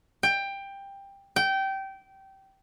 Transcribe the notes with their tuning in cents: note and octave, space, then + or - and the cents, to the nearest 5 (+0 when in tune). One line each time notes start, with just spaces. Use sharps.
G5 +15
G5 -20